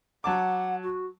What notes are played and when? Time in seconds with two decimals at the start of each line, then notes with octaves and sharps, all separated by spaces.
0.24 F#3 F#5 A5 D6
0.83 F#4